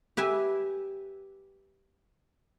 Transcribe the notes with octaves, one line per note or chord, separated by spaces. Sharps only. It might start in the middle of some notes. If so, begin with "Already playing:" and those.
G4 B4 E5 G#5